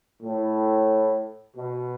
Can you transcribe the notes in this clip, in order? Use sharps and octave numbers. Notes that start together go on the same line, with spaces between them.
A2
B2